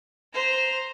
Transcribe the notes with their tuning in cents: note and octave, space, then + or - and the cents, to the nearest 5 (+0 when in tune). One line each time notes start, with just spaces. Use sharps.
C5 +0 A#5 +0